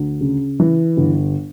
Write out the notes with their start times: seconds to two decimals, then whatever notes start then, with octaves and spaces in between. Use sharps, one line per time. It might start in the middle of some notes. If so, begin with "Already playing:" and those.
Already playing: D2
0.21 C#3
0.60 E3
0.97 G1